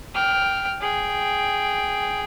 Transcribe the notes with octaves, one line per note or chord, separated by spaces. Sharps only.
G5 F6
G#4 G5